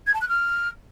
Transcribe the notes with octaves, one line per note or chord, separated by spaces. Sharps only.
G#6
A5
F#6
F6